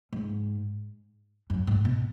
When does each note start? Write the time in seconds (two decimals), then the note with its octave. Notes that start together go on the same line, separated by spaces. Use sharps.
0.13 G#2
1.50 F#2
1.67 G#2
1.85 B2